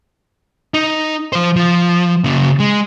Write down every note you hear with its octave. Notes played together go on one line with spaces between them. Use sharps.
D#4
F3 C5
F3
C#3 A#3
G#3